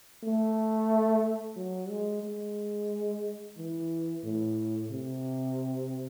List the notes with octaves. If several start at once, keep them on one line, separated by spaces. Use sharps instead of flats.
A3
F#3
G#3
G#3
E3
A2
C3